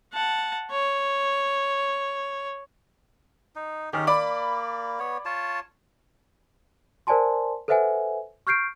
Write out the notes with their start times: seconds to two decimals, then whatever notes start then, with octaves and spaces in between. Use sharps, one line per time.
0.14 F#5 A5
0.71 C#5
3.55 D#4
3.93 D#3 C#4 G4 G#4
4.07 A#3 D5 B5 D6
4.99 B3 C#5
5.25 F4 C#5 A5
7.07 A#4 C5 D5 G#5 A5 C6
7.68 A4 B4 C5 E5 F#5 G#5
8.47 C#6 F6 G6 C7 D7